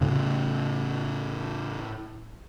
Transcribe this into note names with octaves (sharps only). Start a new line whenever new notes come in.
A2 C#3